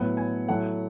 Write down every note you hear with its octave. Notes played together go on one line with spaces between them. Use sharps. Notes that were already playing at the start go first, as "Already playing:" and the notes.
Already playing: A2 F#3 B3 F#5
G#5
A2 F#3 A3 F#5